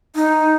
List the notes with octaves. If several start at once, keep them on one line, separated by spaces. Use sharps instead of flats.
D#4